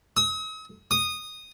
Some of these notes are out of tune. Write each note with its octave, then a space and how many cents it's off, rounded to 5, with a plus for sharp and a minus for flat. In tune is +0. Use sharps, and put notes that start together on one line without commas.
D#6 +45
D#6 -10